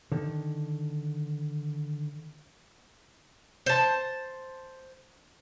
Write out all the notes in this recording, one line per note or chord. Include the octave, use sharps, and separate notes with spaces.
D3 D#3
C5 A5